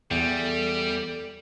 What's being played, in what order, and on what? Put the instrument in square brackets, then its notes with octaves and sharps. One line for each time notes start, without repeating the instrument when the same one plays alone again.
[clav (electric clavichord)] E2 [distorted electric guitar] G3 [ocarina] A4